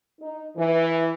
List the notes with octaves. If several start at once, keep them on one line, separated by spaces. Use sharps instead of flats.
D#4
E3